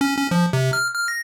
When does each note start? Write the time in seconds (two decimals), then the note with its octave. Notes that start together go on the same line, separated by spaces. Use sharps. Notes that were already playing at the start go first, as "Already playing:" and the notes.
0.01 C#4
0.18 C#4
0.31 F3
0.53 C3
0.73 F6
0.94 F6
1.08 A#6